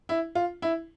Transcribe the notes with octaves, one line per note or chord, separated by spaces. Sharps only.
E4
F4
E4